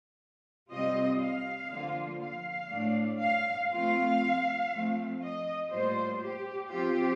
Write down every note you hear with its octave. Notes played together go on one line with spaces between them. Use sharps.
C3 G3 C4 F4 D#5
F5
D3 F3 A#3 F4
F5
A2 A3 D4
F5
F3 A3 C4 F4 F5
F3 A3 C4
D#5
A2 G3 A#3 F4 C5
G4
F3 C4 F4 G4